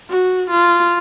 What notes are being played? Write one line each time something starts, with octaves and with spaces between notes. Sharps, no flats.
F#4
F4